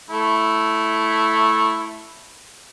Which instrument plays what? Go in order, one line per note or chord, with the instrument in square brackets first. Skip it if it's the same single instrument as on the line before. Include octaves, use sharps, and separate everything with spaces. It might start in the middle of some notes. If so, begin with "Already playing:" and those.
[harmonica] A3 E4